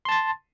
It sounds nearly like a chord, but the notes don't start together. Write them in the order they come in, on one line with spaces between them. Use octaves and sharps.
C6 A5 A6